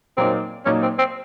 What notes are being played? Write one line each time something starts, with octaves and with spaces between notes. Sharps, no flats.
A#2 F#3 A#3 C4 D#4
A#2 F#3 A#3 C#4 D#4
C4
C4